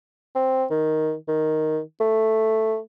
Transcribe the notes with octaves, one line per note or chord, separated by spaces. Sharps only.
C4
D#3
D#3
A3